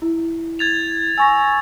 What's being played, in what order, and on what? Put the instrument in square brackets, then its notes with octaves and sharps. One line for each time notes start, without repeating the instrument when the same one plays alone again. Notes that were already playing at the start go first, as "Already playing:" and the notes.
[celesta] E4
[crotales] G#6 A6 F7
[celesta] G#5 C#6 A#6 [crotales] E6